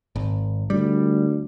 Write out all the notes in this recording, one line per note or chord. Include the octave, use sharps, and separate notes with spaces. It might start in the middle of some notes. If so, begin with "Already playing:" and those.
G#1
D2 G3